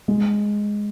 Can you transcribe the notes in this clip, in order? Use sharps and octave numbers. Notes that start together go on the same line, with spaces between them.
G#3